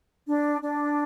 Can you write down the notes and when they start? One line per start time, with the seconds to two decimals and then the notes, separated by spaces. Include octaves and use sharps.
0.27 D4
0.61 D4